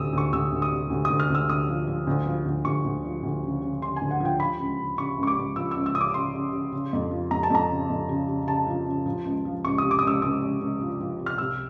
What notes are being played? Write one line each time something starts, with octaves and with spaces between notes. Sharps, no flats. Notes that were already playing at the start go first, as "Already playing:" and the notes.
Already playing: D2 C3 D#6 E6
D2 C#6
D2 E6
D2
D#6
C3
D2
D#6
D2
F6
D2 E6
D2 D#6
F3
F3
D2
F3
D2
D2 C#6
D2
F3
D2
C#3
C#3
C#3 C6
G#5
D2
F#5
F3 G5
F3 B5
C#2
C#3
C#3 C#6
C#2
C#6
D6
C#2
F3 E6
C#2 E6
E6
C#3 D#6
D6
C#3 C6
C#3
C#3
C#3
F2
F3
F2 A#5
A5
F2 A#5
C#3
F2
C#3
C#3
C#3 A5
F3
C#3
F3
C#2
F3
C#2 C#6
C3 D#6
D6
D#6
C#2 E6
C#2 D#6
C#2
C#2
F3
F3
C3
F6
C2 E6